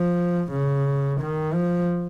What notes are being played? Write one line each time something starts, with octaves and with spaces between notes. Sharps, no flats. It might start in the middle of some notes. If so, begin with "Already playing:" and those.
Already playing: F3
C#3
D#3
F3